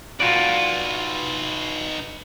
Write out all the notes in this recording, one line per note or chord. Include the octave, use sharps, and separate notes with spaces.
D#4 F4 F#4 B4 D5